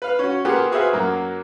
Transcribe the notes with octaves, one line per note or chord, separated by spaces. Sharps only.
B4 F5 F6
C#4 F#4
A#3 B3 F4 G4 G#4 F#5
F#4 G#4 B4 C5 E5 F5
F#2 F#3 A#3